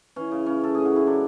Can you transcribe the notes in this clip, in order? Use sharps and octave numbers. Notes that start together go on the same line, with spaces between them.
E3 C#4
C#3
C#3 C#4
C#3 A4
A2 G#4
F#4
A2 E4
F#3 D4